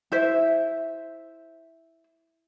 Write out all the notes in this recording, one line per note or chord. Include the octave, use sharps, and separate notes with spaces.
E4 C5 E5